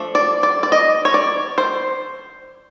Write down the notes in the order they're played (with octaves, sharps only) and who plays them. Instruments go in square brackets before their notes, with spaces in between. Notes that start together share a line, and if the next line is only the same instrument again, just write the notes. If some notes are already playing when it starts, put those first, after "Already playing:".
Already playing: [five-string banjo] F3 A3 D4
D5
D5
D5
D#5
C#5
D5
C5